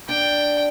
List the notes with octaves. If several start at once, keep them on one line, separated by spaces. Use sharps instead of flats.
D4 G5